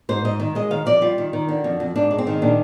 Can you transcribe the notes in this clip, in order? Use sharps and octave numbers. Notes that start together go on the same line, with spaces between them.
G#2 C5
G#2 D#5
D#3
G#3 D#5
D#3 F5
F2 D5
G3 F4
D#3
D#3
D3
F2
F2
G#2 D4
G#3
C4
D#3
A#2 D4